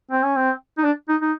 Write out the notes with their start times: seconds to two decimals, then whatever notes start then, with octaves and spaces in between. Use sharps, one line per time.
0.11 C4
0.24 C#4
0.36 C4
0.78 D#4
0.84 D4
1.09 D#4
1.21 D#4